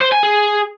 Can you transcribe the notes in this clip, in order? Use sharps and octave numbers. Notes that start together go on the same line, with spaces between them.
C5
G#5
G#4